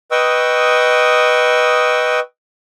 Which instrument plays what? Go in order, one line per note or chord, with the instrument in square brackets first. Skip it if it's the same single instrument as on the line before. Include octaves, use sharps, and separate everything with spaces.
[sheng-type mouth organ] B4 D#5 G5 C#6 D#6 E6